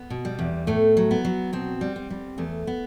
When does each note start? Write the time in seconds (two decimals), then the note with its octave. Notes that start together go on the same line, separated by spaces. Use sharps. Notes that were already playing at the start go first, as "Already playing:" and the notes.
Already playing: B3
0.10 B2
0.25 G3
0.39 E2
0.67 A2 A3
0.97 F#3
1.11 B3
1.25 F#3
1.53 B2 C4
1.81 G3
1.96 C4
2.10 G3
2.38 E2 A3
2.67 B3